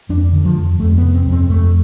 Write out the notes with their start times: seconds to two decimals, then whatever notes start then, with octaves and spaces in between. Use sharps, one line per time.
0.09 F2 D4
0.33 D3
0.45 F3
0.57 F2
0.79 F2 A3
0.98 B3
1.03 C3
1.14 C4
1.27 F2
1.32 C4
1.50 F2 A3